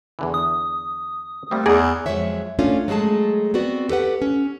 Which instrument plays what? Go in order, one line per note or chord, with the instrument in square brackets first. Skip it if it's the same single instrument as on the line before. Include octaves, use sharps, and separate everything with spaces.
[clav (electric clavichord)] E2 D3 E3
[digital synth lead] D#6
[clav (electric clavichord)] G3 A#3 C4 [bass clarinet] A3
[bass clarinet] E2 [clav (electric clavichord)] D#4 D5 [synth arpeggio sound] G#4
[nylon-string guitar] F2 C3 F#3 G#3 C#5 E5
A3 C#4 D4 F4
F#3 G#3 A3 G#4 A5
B3 C4 F#4 D5
G4 A4 B4 F#5
C#4